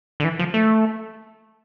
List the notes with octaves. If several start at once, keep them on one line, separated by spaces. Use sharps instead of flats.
D3
E3
F3
A3